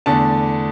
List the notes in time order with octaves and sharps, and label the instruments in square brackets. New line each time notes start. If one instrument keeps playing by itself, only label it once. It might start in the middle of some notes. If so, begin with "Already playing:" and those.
[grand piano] E2 D3 A3 D4 A5